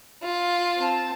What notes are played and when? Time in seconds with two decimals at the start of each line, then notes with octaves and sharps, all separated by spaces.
0.23 F4
0.77 C4 A5